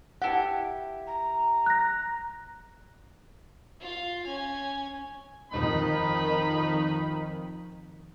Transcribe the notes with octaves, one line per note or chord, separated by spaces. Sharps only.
E4 G4 F#5 A5
A#5
F#6 A#6
F4 F5
C#4 G#5
F2 D#3 D#4 B5